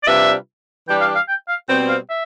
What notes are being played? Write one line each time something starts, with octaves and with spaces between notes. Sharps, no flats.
D5
C3 G3 D4 F4 B4 E5
E3 G3 D4 G4 G5
F5
F5
G5
F5
B2 G3 C4 G5
F5
E5